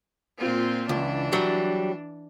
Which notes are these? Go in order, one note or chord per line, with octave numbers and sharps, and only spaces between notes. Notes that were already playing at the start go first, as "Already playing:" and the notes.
A#2 C4 F4
C#2 E3 D4
F#3 G3